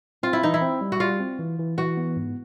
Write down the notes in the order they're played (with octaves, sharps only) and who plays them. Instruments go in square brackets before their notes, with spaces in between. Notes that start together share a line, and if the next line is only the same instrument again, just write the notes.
[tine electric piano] C4 [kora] F4
[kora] E4
[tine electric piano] E3 [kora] D#4
[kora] E4
[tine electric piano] C4
G3
[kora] F#4
[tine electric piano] G3 [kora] F4
[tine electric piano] C4
E3
E3
[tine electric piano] E3 [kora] F#4
[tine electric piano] B3
G#2